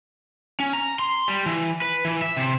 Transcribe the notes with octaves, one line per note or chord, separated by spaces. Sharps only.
C#4
A#5
C6
G3
E3
B4
E3
E5
C3